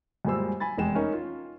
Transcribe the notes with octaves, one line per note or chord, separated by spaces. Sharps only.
F#2 A#2 G3 G#3 C5 E6
G#5 B5 A6
F1 E2 G#3 G5 E7
C#4 D#4 A#4 C#5
F4